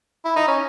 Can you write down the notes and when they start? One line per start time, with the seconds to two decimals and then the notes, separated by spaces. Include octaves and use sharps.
0.25 E4
0.36 D#4
0.48 C#4